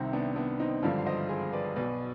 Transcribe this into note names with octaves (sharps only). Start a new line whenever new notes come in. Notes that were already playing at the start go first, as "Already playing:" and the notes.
Already playing: C2 C3 D#3 C4
B3 D4
B3 D4
C4 D#4
G#1 G2 D3 F3 D4 F4
F5
C5 D#5
G#4 C5
B4 D5
B1 B2 B4 D5